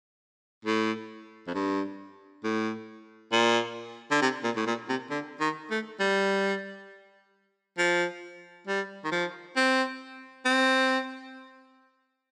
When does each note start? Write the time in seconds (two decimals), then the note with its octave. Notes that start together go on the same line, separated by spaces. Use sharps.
0.65 A2
1.47 F2
1.54 G2
2.44 A2
3.32 A#2
4.11 D3
4.22 C3
4.43 A#2
4.56 A2
4.67 A#2
4.89 C3
5.10 D3
5.40 D#3
5.70 A3
6.00 G3
7.78 F3
8.67 G3
9.05 D#3
9.11 F3
9.56 C4
10.45 C4